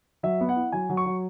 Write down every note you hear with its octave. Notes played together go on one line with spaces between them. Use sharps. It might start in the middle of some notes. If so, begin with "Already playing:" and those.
F#3 E5
B3
F#5
E4
F#3 G#5
F#3
C#6
F#3